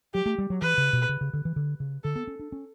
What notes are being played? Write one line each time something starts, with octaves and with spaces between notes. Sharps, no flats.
F#3 G4
A3
G3
F#3
E3 B4
C#3
B2
C#3
C#3
D3
E3
D3
C#3
D3 A4
B3
C#4
D4
C#4